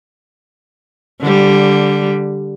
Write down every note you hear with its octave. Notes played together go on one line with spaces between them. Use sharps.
D3 G3